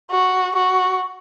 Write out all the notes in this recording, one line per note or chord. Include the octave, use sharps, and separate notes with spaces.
F#4
F#4